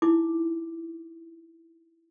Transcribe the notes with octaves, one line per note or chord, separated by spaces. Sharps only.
D#4 E4 D6